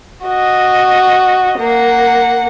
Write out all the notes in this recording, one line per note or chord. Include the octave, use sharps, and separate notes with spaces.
F#4 D#5
A#3 F#5